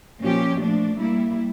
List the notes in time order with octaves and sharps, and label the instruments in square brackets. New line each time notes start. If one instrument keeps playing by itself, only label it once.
[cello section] A#2 F3 C#4 G4
F3 A3 D4
G3 A#3 E4